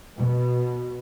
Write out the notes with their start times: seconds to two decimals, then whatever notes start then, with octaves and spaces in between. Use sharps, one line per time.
0.18 B2